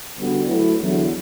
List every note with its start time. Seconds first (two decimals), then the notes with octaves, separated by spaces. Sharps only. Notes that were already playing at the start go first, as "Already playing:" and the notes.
0.16 D3 G3 B3 F#4
0.47 F#3 A3 E4 B4
0.78 E2 D3 F#3 B3 E4